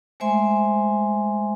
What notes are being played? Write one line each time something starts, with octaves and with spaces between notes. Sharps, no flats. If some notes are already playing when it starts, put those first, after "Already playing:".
G#3 A3 C5 E5 G#5 C6